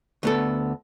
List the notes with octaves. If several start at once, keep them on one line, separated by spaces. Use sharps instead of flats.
D2 B3 A4